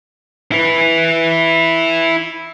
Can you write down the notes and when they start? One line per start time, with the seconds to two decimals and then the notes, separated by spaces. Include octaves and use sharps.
0.52 E4 B4